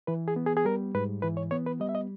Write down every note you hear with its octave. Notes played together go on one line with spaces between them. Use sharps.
E3 B4
G#4
B3
G#4
G#4
G3 A#4
G#2 B4
E3 B4
C#5
B3 C#5
B4
G3 D#5
E5
D#5